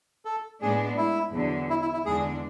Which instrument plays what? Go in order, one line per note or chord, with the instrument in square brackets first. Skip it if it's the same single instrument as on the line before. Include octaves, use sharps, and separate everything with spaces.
[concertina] A4
[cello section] A2 G#3 B3 D4 [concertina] G#4
[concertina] E4
[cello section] E2 D3 F#3
[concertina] E4
E4
E4
[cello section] E2 D3 G#3 D4 [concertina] G#4